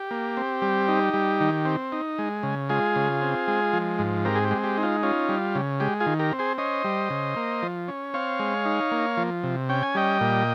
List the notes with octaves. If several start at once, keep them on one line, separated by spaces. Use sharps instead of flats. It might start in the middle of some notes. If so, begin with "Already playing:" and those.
Already playing: G4
A#3
C4
G3
D#4
G3
D#3
C4
D#4
G#3
C#3
G#3 F4 G#4
C#3
C4
G#3
F3
G#2
C4 G4 A#4
G#4
G4
G#3
G4
D#4
F4
C#4 F4
G3
C#3
G#3 G4
F4 G#4
D#3
G4 A#4
C4
G#4 C5
C#4 C5 D#5
G3
C#3
A#3
F3
C#4
C4 C#5 F5
G#3
D#4
A#3
F3
C3
C#4 G5
G#5
G3 D#5 G5
A#2